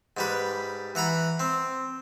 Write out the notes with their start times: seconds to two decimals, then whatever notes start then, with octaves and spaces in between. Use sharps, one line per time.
0.17 G#2 G3 B4
0.95 E3 F#5 A#5 B5
1.39 C4